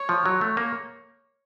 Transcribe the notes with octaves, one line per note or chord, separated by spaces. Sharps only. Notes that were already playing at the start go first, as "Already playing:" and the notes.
Already playing: C#5
F3
F#3
A3
A#3